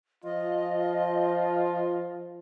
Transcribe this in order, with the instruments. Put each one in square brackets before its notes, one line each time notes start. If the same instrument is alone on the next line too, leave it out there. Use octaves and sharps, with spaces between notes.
[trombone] F3 [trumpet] F4 [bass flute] D#5